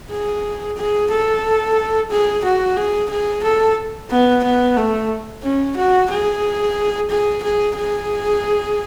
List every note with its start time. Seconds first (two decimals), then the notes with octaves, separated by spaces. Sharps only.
0.11 G#4
0.77 G#4
1.11 A4
2.10 G#4
2.44 F#4
2.77 G#4
3.10 G#4
3.43 A4
4.10 B3
4.43 B3
4.76 A3
5.43 C#4
5.76 F#4
6.10 G#4
7.09 G#4
7.43 G#4
7.76 G#4